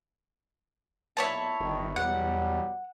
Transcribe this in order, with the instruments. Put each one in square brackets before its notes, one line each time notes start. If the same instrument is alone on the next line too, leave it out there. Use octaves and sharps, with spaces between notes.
[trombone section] B1 A#2 [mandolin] E4 C#5 A5
[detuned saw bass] G1 [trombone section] D#3
[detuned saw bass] E2 [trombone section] B2 F#3 G3 [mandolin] F#5